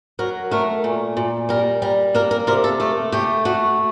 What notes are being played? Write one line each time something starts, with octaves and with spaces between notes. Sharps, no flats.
F#3 A#4
A3 A#4
A#2
A#2
G3 A#4
G3 A#4
A#3 A#4
A#4
C3 A#4
A4
A3 A4
A3 G4
A3 F#4